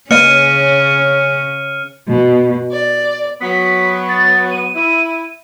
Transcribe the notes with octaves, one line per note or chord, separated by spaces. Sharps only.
C#3 A#3 C#4 B4 D#5 F6 C#7 D#7
B2
D5
F#3 B3 B6
A6
D#7
E4